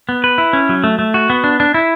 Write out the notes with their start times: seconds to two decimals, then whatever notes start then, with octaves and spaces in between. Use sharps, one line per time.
0.09 B3
0.24 B4
0.38 E4
0.53 C#4
0.69 F#3
0.84 A3
0.99 A3
1.14 F#4
1.30 B3
1.44 D4
1.60 D4
1.74 E4